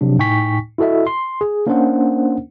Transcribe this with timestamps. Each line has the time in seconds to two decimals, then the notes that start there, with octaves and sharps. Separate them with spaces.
0.01 C3 F3 F#3 D4
0.19 A2 D#4 G5 G#5 C#6 B6
0.78 E4 F#4 A4 D#5 E5
1.07 C6
1.41 G#4
1.67 A#3 C#4 D4 A#4 C5 F#5